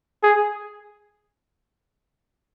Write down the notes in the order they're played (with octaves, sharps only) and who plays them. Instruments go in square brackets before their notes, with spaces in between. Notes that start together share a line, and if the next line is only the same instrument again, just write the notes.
[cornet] G#4